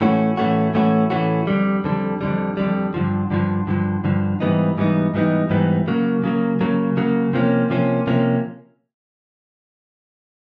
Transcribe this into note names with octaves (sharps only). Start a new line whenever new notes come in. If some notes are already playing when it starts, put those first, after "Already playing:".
A2 E3 A3 C#4 F#4
A2 E3 A3 C#4 F#4
A2 E3 A3 C#4 F#4
A2 E3 A3 C#4 F#4
F2 D3 G3
F2 D3 G3
F2 D3 G3
F2 D3 G3
G2 D3 F3
G2 D3 F3
G2 D3 F3
G2 D3 F3
G#2 E3 G3 B3 D#4
G#2 E3 G3 B3 D#4
G#2 E3 G3 B3 D#4
G#2 E3 G3 B3 D#4
C#3 F#3 A#3
C#3 F#3 A#3
C#3 F#3 A#3
C#3 F#3 A#3
C3 F3 A#3 C#4
C3 F3 A#3 C#4
C3 F3 A#3 C#4